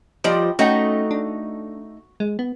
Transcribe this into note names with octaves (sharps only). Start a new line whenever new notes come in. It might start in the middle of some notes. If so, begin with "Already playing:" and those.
F3 G3 D5 D#5 G5
A3 C#4 D#4 F#4 G5
D4
G#3
B3